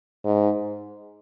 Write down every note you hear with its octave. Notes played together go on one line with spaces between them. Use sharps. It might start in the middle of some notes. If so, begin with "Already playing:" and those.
G#2